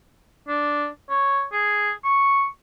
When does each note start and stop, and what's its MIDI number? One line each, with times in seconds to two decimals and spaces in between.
0.48 0.86 62
1.10 1.44 73
1.53 1.91 68
2.04 2.45 85